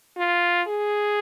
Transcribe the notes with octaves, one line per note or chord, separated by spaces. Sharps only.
F4
G#4